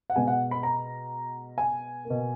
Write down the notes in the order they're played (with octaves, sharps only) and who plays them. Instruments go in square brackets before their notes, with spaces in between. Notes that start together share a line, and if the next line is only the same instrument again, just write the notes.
[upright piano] F#5
B2 G#3 B3 G#5
F#5
B5
A#5
G#5
A#3
B2